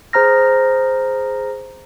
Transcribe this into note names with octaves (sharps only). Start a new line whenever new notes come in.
G#4 C5 A#5 F6 A#6